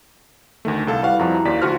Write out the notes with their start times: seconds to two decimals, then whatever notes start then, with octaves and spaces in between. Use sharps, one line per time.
0.65 D2 D#3 A3
0.87 C2 A4 F5
1.03 E3 G3 F#4 F5 F#5
1.19 F2 F3 G3 E4 F#4 A#5
1.45 D#2 C5 D5 F5 B6
1.62 D2 F3 F#4 F#5 F6